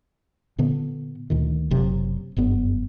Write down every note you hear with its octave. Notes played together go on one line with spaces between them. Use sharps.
A#2 D3 B3
D2 A#2 D#3
F#1 C3 F#3
F#1 G2 B3